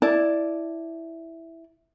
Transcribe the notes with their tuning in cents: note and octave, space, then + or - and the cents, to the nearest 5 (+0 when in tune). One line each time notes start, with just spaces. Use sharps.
E4 +0 D5 +0 A5 +0